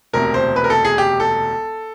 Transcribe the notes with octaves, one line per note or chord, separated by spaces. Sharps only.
E1 D2 C3 A#4
C5
B4
A#4
A4
G#4
G4
A4